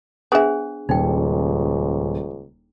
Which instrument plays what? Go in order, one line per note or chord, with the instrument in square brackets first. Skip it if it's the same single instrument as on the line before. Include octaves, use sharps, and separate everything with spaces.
[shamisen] B3 E5 [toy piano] D4 G#4 C5
[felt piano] D#1 [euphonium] C#2 [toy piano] D#4 G5